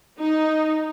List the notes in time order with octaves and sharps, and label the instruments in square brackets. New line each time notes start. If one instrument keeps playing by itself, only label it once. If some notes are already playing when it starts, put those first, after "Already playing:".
[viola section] D#4